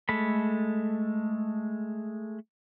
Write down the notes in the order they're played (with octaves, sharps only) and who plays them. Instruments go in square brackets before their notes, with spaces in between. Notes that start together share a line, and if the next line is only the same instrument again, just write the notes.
[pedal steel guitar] G#3 A3 A4 B5